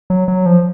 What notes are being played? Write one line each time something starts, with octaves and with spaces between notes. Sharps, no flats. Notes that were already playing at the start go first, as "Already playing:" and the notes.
F#3
F#3
F3